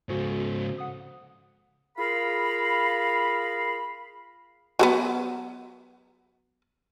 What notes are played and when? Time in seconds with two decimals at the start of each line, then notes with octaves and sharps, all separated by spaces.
0.09 G#2 C#3 F#4 A4 C5
0.78 F#5 D#6
1.97 F4 G#4 A#4 F5 B5
4.79 F#3 A#3 B3